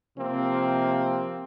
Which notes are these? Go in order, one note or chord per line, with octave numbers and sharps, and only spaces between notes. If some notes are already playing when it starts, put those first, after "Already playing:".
C3 F3 A#3 C4